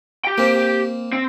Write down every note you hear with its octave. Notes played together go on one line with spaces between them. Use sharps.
G4 G5
A#3 C4
C4